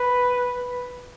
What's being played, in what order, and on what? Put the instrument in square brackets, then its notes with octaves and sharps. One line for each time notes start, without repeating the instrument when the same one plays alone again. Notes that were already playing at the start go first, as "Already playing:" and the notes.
Already playing: [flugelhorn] B4